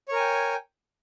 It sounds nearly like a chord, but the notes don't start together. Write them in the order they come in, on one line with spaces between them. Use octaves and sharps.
C#5 A#4 G#5 G5